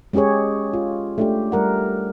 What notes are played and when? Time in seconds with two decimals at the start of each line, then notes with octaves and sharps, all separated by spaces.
0.13 G#3 C#4 G4 G#4 C#5
0.73 F4
1.18 A3 D4 G4
1.52 G3 A#4 F#5